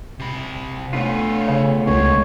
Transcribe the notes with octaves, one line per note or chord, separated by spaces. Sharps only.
C3 B5
A3 B3 D4 F4 C#5
C#3
C#2 C#3 G#3 C#5